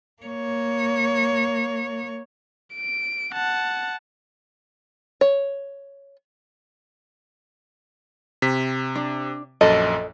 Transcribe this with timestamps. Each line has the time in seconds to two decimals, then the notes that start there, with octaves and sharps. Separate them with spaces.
0.23 A#3 C#5
2.75 D7
3.34 F#5 A5
5.21 C#5
8.42 C3 B6
8.95 D4
9.61 A#1 F#2 A4 D#5